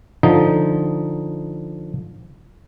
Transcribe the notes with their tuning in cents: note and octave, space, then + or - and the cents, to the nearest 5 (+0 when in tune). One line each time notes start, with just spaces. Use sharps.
D3 +10 F3 +0 D#4 +0